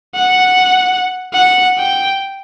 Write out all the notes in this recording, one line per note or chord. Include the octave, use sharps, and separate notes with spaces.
F#5
F#5
G5